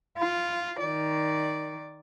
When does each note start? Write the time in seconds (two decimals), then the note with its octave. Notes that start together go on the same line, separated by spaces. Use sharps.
0.18 F4
0.81 D#3 D5